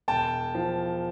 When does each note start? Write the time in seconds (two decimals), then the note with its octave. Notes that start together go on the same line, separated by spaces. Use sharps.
0.08 E1 G5 A5
0.55 F3